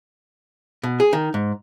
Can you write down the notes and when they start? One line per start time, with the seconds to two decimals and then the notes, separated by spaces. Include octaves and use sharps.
0.83 B2
1.00 G#4
1.13 D#3
1.34 G#2